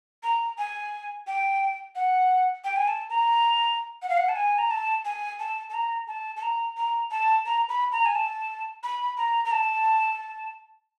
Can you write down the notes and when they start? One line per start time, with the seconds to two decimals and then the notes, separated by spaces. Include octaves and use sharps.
0.23 A#5
0.58 G#5
1.27 G5
1.95 F#5
2.64 G5
2.76 G#5
2.88 A5
3.10 A#5
4.02 F#5
4.09 F5
4.18 F#5
4.29 A5
4.36 G#5
4.58 A#5
4.71 A5
5.05 G#5
5.39 A5
5.70 A5
5.74 A#5
6.08 A5
6.36 A5
6.42 A#5
6.77 A#5
7.11 A5
7.46 A#5
7.69 B5
7.92 A#5
8.06 G#5
8.15 A5
8.83 B5
9.18 A#5
9.45 A#5
9.52 A5